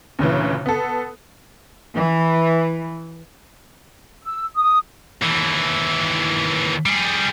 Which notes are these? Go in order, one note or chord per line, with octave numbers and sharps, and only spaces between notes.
D2 A#2 C#3 E3
B3 A4
E3
E6
D#6
D#2 E3
G3 G#4